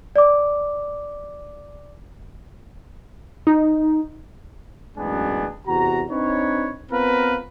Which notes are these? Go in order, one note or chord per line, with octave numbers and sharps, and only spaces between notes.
D5 D6
D#4
A1 F#2 G#3 B3 D4 G#5
E2 C3 F#4 A#5
C4 D4 D#4 B4 C#5
B3 C4 F4 A#4 B4 F5